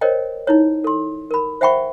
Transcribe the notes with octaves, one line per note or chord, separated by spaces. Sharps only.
A#4 C5 C#5 D#5 G5
D#4 E4 C#5
A4 C6
A#4 B5
C5 E5 F#5 G5 B5 C#6